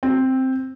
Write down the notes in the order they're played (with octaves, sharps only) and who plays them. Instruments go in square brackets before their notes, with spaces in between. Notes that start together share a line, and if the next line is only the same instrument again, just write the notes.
[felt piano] C4